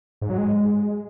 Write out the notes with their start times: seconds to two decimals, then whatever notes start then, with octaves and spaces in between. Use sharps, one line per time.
0.21 G#2
0.30 F#3
0.38 G#3